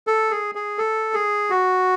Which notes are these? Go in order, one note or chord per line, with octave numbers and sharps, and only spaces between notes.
A4
G#4
G#4
A4
G#4
F#4